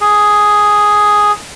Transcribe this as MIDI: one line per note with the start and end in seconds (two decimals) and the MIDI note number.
0.01 1.32 68